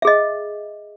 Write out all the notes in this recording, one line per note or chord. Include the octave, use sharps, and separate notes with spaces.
G#4 D#5 E5